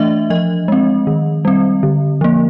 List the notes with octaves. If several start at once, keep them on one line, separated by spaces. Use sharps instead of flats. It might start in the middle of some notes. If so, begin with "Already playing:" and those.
Already playing: E3 A3 D4 D#5 E5
F3 D#5
G#3 C4
D#3
G3 C4
D3
F3 A#3